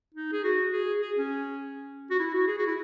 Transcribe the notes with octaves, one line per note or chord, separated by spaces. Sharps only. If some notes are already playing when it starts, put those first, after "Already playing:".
D#4
G#4
F#4
G#4
G#4
C#4
F#4
E4
F#4
G#4
F#4
E4